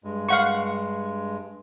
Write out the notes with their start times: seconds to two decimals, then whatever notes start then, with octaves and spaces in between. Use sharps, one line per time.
0.04 G2 G#3
0.29 F5 F#5 C#6